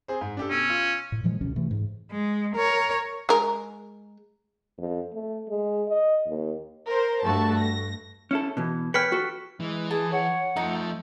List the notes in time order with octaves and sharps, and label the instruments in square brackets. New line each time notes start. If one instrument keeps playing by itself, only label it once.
[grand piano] C4 G#4 C5
G#2
D4 G4 A4
[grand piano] B2 E6 D7 [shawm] C#4
[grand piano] F4
[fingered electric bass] A2
A#2 E3 F3 G#3
C#2 B2 D3 C#4
C3 E3 A3
G#2
[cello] G#3
A#4 C#5
[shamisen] G#3 A#4
[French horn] F2
A3
G#3
D#5
D#2
[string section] A#4 C5
G2 A3 F#4 A5
A#6
[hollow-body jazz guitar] C#4 E4 A4
B2 E3
[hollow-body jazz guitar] B4 C#5 G5 [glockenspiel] F6 B6 C#7
[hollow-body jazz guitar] F#4 A4
[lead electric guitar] E3 [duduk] G#3
[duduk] G#4 [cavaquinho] A5
[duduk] C#5 [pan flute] F#5
[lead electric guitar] F3 A4 [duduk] A3 [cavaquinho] D#4